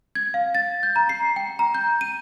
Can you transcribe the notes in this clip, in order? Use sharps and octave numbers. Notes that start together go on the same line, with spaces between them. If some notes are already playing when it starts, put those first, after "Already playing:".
G#6
F5
A6
G6
A#5
C7
G5
A#5
G6
D#7